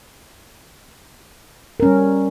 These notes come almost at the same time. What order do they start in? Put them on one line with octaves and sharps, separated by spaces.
A#4 C#4 G3